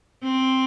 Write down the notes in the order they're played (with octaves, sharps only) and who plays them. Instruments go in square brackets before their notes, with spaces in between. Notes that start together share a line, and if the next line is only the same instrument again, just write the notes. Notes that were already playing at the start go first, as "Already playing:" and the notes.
[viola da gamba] C4